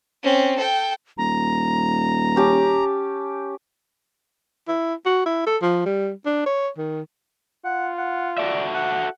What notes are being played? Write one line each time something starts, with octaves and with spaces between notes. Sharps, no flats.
C4 C#4
A4 G5
D#1 A#5
C#4 G4 A5
E4
F#4
E4
A4
F3
G3
D4
C#5
D#3
F4 F#5
F#5
F#4 A4 D5 E5
F#5